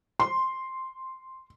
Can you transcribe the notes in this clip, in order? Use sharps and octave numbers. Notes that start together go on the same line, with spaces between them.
C6